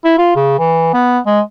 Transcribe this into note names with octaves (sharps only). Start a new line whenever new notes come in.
E4
F4
C#3
E3
B3
G#3